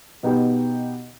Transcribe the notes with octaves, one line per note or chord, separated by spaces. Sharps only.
B2 B3 D#4 G4